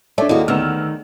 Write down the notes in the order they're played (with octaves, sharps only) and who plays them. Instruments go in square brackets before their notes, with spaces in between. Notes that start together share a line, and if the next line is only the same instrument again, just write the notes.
[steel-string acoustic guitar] A3 [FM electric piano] D4 E5 [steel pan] C#5 D5 A5
[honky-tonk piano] D#2 [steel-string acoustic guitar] A#3 F#4 [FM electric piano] E4 [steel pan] G#4 D#5
[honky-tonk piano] D2 B3 E7 [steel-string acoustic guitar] D#3 [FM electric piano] E6 F6